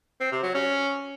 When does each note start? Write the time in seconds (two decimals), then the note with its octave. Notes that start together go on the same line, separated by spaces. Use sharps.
0.20 C4
0.32 C3
0.43 F#3
0.54 C#4